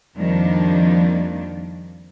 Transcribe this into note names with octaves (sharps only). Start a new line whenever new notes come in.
F2 D#3 F3 G3 A#3 D4